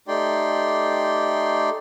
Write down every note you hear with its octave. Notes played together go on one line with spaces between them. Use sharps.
A3 D#4 G4 D5 G5 C6